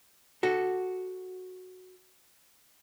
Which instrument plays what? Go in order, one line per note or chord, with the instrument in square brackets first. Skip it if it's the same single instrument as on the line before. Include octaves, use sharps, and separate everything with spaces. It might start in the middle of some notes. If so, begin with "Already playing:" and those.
[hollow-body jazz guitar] F#4 A4